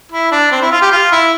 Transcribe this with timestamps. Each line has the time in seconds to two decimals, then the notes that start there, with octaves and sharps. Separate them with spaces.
0.12 E4
0.32 D4
0.51 C4
0.61 E4
0.72 F4
0.82 G4
0.92 F4
1.12 E4